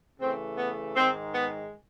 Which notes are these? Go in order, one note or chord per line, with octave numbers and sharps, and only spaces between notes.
C#3 E3 A3 C4
B3
G#2 D#3 G#3 C4
B3